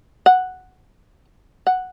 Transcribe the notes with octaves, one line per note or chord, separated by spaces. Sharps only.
F#5
F#5